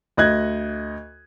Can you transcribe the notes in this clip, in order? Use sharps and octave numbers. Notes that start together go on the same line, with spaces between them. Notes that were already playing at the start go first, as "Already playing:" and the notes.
D2 D#5 F#6 G#6